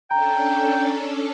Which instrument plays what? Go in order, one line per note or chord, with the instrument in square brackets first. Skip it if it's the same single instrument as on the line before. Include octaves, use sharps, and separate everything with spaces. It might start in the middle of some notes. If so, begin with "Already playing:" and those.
[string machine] C#4 D4 A4 [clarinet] G5 [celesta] A#5